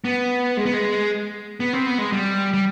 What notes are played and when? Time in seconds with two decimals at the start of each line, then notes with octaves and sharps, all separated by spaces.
0.05 B3
0.57 G#3
0.65 B3
0.73 G#3
1.60 B3
1.73 C4
1.86 B3
1.98 G#3
2.12 G3
2.53 G3